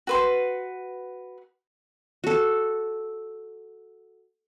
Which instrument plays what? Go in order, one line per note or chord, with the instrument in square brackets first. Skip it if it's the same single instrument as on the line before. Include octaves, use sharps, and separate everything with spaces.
[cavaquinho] F#4 B4 C6
[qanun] F#4 A4